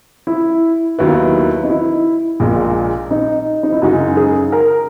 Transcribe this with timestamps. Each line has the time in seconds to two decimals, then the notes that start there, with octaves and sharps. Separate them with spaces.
0.27 E4
0.99 D#2 D#3 F#3 B3 E4
1.64 D#4
1.70 E4
2.40 A#1 A#2 G#3
3.11 D#4
3.63 D#4
3.72 E4
3.82 F#2 C#3 G#3 D#4 F#4
4.17 G#4
4.52 A#4